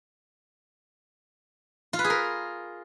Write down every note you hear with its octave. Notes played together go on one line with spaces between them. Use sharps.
F4
B4
G#4
A#4